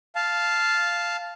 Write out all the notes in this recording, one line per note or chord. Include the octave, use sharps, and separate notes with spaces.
F5 A5